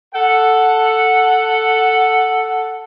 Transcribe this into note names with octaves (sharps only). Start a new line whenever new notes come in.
A4 F#5